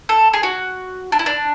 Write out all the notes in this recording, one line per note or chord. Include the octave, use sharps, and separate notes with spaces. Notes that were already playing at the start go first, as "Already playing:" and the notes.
A4
G#4
F#4
D4
E4
D4